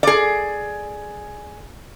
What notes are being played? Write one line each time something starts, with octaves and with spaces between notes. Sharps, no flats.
G#4 D5